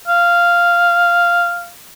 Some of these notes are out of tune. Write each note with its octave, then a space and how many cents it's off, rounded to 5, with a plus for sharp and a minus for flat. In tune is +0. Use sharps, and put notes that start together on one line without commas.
F5 -5